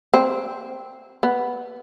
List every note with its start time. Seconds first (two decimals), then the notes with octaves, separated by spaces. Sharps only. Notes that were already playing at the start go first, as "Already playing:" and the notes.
0.14 C4
1.23 B3